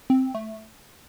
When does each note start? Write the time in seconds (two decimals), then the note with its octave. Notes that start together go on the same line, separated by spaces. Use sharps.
0.10 C4
0.35 A3